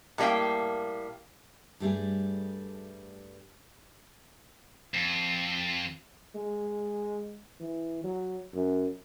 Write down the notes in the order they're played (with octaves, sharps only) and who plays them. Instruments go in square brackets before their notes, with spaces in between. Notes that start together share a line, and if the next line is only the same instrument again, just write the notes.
[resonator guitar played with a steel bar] A2 G3 A#3 F5 G5
[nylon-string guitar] G2 G3 A3 G#4
[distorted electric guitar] F2
[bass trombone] G#3
E3
F#3
F#2